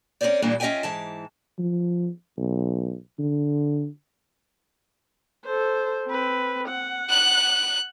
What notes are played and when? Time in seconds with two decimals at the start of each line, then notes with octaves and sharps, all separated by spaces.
0.21 C4 C#4 G#4 A#4 C5 D5
0.42 G2 A#2 E3 G3 A#3 D4
0.60 C#4 F4 D#5 E5 G5 G#5
0.83 G#2 E3 A5
1.59 F3
2.37 B1
3.19 D3
5.45 A4 C5
6.08 C4 B4
6.69 F#5
7.09 F#6